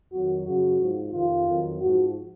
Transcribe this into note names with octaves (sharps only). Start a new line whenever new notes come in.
F2 D#3 F#3 F#4
F#2 C#3 F#3 F#4
G#2 F3
F2 C3 D#3 F4
F2 D#3 F#3
G#2 F3 F#4